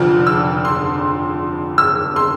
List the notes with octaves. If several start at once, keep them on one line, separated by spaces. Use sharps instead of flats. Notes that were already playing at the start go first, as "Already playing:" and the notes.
Already playing: F1 F2 D3 F3 F6
E6
C6
E6
C6